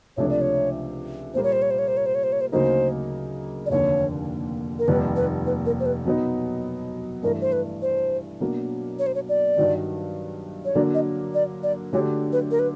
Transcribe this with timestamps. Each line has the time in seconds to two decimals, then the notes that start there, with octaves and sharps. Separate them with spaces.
0.17 C#2 C3 F3 A3 D4 C#5
0.29 D5
0.41 C#5
1.34 A#2 G3 A#3 C5
1.43 C#5
1.52 C5
1.62 C#5
1.71 C5
1.79 C#5
1.88 C5
1.97 C#5
2.06 C5
2.15 C#5
2.24 C5
2.32 C#5
2.41 C5
2.52 D2 C#3 F#3 A#3 D#4 C5
3.66 D5
3.70 F1 D#2 D3 C#5
4.79 A#4
4.88 F1 D#2 D#3 G3 B4
5.16 B4
5.46 B4
5.66 A#4
5.80 C5
5.86 B4
6.05 B2 F#3 B3 D#4
7.23 G2 E3 A3 A#4
7.41 C5
7.52 B4
7.82 C5
8.40 B2 F#3 A#3 D4
8.99 C#5
9.06 C5
9.15 C#5
9.29 D5
9.57 G2 D#3 F#3
10.65 C#5
10.75 D3 F#3 A#3 D4 D5
10.94 D#5
11.34 D5
11.63 D5
11.93 D3 F#3 A3 D4 G4 C#5
12.32 B4
12.51 A#4
12.59 B4